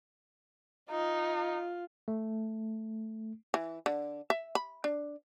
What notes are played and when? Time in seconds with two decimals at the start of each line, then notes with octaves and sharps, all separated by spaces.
0.91 D#4 F4
2.08 A3
3.54 E3
3.86 D3
4.30 E5
4.55 B5
4.84 D4